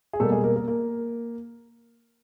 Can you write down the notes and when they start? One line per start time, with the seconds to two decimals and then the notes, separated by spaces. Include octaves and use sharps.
0.13 G#4
0.20 B2 G3 A3 A#3 A4
0.32 G#3 G#4
0.44 A#3 A#4
0.56 A#3 A#4
0.68 A#3 A#4